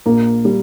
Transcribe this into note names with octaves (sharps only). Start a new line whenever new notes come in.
A#1 A#3
G3